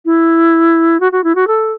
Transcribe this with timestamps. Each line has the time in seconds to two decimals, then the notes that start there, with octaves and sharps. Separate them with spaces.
0.05 E4
1.00 F#4
1.12 F#4
1.24 E4
1.35 F#4
1.47 A4